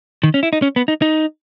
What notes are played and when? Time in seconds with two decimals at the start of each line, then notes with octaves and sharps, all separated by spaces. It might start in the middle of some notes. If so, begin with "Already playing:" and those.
0.23 D#3
0.34 C#4
0.43 E4
0.53 D#4
0.62 C#4
0.76 B3
0.88 D#4
1.02 D#4